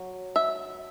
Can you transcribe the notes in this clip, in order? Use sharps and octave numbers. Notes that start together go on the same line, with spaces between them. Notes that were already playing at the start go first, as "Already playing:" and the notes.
Already playing: F#3
E5